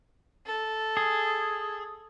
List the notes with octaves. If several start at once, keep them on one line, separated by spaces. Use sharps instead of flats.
A4
G#4